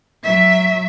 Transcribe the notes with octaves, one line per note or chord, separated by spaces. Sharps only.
F#3 E5